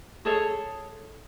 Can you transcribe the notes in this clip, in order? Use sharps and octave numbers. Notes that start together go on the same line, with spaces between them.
G#4 A4 C#5